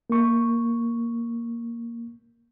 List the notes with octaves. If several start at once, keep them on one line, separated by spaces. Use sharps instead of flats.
A#3 C#6